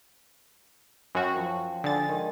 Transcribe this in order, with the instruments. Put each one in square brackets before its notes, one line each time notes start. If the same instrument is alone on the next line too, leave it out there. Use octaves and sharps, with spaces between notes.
[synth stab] F#2 F#4 [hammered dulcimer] G5
[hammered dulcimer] F3
[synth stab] D3 A6 [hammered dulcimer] G#4
[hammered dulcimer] D#3 G#3